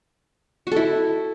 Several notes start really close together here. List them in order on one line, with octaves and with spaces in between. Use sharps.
F#4 A4 E4